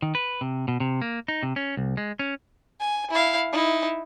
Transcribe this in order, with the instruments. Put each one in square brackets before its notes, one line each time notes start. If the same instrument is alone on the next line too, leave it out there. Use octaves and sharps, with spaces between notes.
[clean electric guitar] D#3
B4
C3
B2
C3
A#3
D#4
C3
C#4
C2
G#3
C#4
[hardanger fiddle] G#5
E4 F5
D#4 E4